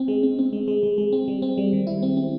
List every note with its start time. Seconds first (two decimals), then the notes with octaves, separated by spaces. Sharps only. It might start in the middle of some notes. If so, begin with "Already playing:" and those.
Already playing: C4
0.08 G#3
0.23 C4
0.39 C4
0.53 G#3
0.68 G#3
0.83 G#3
0.98 G#3
1.12 C4
1.28 G3
1.42 C4
1.58 G3
1.73 D#3
1.87 E4
2.02 C4
2.17 C4